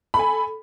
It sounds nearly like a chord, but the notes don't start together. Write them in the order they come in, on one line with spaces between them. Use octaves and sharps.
B5 A4 G#5